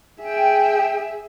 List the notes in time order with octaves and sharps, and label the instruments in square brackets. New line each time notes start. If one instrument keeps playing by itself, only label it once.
[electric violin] G#4 E5 [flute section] G5